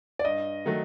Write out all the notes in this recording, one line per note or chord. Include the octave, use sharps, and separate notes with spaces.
D5
G2 D#5
D#3 F#3 A3 D#4